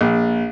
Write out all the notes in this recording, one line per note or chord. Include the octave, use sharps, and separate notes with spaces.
A#1